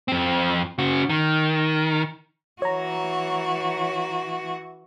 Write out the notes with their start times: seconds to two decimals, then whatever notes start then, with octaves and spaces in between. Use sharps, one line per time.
0.08 F2 C4
0.79 C#3 F#4
1.09 D#3
2.62 E3 F#4 C#5 A#5